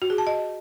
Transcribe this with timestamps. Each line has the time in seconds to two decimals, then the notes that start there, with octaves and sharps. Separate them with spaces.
0.02 F#4
0.10 G#4
0.18 A5
0.27 D#5